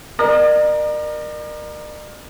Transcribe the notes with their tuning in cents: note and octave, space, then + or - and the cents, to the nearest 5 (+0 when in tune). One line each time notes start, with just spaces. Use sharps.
A#4 +10 D5 +45